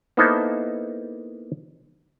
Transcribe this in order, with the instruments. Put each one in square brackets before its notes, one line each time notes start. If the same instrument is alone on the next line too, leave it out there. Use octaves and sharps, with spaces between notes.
[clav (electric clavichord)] A#3 B3 D#4 E4 A4 C5